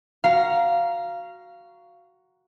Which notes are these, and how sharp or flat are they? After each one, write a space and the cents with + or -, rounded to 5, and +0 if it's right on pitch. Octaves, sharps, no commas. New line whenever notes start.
F#4 +0 F5 -15 A#5 +10